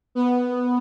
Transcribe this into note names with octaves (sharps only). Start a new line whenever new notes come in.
B3